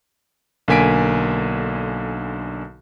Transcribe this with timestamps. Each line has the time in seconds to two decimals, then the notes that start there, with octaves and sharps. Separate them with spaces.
0.68 B1 D3 A#3 G#5 B6 D7